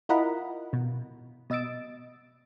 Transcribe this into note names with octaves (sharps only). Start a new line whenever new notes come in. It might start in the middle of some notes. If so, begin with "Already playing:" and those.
E4 F4 A#4 D#5 F#5 B5
B2
B2 D#5 E6 A6 D7